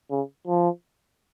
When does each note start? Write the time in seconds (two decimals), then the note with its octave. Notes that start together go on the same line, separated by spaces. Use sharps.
0.10 C#3
0.47 F3